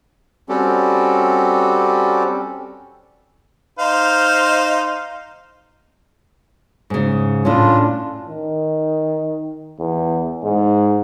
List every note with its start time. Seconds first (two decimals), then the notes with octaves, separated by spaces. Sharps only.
0.49 G3 C4 C#4 F#4 G4 A4
3.79 D#4 C5 F5
6.90 G#2 C#3
7.45 A2 C#4 D4 F4
8.27 D#3
9.79 E2
10.44 G#2